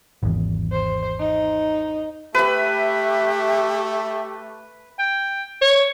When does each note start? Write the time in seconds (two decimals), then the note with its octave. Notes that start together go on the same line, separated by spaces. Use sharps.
0.23 G#1 E2
0.72 C5
1.20 D#4
2.35 A3 G4 B4 E5 B5
4.99 G5
5.62 C#5